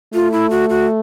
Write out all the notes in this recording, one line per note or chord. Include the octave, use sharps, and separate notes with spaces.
A3 F4
E4
F#4
F#4